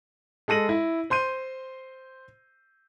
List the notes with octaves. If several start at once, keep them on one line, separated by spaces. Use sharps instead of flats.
G#3 A4 A#6 D#7 F#7
E4
C5 C6 G6 D#7